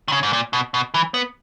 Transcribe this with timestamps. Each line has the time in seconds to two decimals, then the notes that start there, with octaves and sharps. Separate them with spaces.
0.08 D#3
0.12 C#3
0.23 G#2
0.33 A#2
0.53 B2
0.74 B2
0.94 E3
1.14 B3